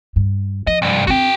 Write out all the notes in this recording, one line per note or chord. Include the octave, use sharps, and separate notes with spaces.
G2
F3 D#5
C2 G2
C4 D4 F#4 G5